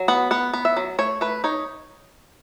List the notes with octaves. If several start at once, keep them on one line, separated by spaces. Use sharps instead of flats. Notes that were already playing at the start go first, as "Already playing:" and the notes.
Already playing: F#3
B3 F#5
B3 F#5
B3
E5
F#3
A3 C#5
A3 B4
D#4 C#5